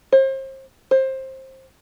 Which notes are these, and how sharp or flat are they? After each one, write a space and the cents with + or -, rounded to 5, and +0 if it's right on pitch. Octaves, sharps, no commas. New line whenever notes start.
C5 +35
C5 +20